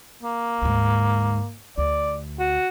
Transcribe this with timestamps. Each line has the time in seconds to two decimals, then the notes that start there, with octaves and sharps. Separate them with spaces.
0.23 A#3
0.62 D2 G#2
1.78 D2 D5
2.39 F#4